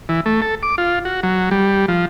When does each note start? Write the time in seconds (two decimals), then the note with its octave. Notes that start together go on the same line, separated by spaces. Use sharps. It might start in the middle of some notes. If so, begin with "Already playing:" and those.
0.09 E3
0.26 A3
0.42 A4
0.63 D6
0.78 F4
1.05 F#4
1.23 F#3
1.51 G3
1.88 F3